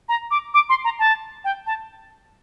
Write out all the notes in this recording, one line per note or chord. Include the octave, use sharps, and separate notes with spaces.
A#5
D6
D6
C6
A#5
A5
G5
A5